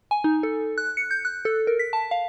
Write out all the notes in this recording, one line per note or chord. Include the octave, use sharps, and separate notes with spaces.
G#5
D#4
A4
F#6
C#7
G6
F#6
A4
A#4
B6
A5
F5